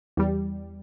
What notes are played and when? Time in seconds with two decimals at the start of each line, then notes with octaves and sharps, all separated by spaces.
0.17 E2 G3